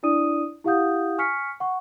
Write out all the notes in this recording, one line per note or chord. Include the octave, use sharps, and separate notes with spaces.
D4 E4 D5 D#6 D#7
E4 G4 F5 F#5 D#6 G6
G#5 C#6 F6 B6 C#7
F#5 C#6